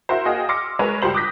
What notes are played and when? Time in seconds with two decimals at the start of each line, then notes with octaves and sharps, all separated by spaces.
0.09 E4 F#4 A#4 C5
0.25 A#3 F#4 G#4 D#5 F5 G5
0.49 C6 D6 E6 F6 A#6 C#7
0.79 G#3 A#4 B4 C#5
1.02 C#2 G3 G4 C5 F#7
1.14 D6 D#6 F#6 G6 A#6 B6